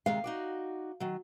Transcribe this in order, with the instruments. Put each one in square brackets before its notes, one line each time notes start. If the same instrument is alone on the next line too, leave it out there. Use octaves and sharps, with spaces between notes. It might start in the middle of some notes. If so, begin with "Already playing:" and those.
[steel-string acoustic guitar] C3 D#3 G#3 [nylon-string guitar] F5
[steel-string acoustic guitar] D#4 F#4 D5
D#3 F#3